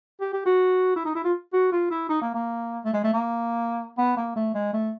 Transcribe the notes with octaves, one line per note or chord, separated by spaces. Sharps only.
G4
G4
F#4
E4
D#4
E4
F4
F#4
F4
E4
D#4
A#3
A#3
A3
G#3
A3
A#3
B3
A#3
A3
G#3
A3